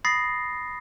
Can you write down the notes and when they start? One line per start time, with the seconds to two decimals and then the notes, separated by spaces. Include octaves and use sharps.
0.05 B5 D#6 A6 A#6 C7